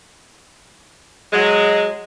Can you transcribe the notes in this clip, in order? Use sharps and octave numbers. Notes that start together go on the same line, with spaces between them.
F#3 G#3